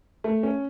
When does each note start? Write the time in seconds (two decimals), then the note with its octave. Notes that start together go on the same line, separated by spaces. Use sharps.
0.24 A3
0.43 C#4